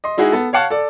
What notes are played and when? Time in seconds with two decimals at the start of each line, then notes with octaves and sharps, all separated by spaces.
0.04 D#5 C6
0.17 G#3 D#4 E4 F#4 G#4
0.32 B3 A4
0.53 C#5 F5 F#5 A5
0.70 A4 D5